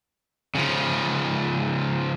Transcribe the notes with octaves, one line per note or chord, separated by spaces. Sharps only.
C#3 F3